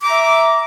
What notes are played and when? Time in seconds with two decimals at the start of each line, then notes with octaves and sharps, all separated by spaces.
0.01 D6
0.05 A#5
0.09 E5